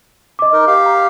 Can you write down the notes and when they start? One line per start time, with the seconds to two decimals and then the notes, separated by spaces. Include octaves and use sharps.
0.39 D#5 D6
0.53 D#4 A#4
0.67 G4 F5
0.86 A#5